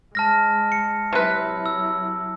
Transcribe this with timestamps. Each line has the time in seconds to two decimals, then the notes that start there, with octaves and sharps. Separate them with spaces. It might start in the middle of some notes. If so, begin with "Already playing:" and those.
0.15 G#3 A5 F6 A#6
0.72 C#7
1.13 C3 F#3 E4 B4
1.66 E6